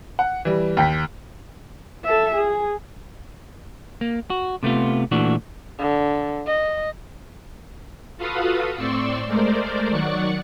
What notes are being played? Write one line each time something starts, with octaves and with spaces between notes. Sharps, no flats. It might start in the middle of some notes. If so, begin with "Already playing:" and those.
F#5
E3 G3
D#2 G5 B6
A4 E5
G#4
A#3
F#4
C3 A3 B3 F4
A#2 E3 A3 D4 F#4
D3
D#5
F4 F#4 A4 B4 F5 D#6
A2 C4 D5 C6 C#6 E6
G#3 A3 A#4 C5 D5
D#3 F#3 D5 F#5 C#6 C#7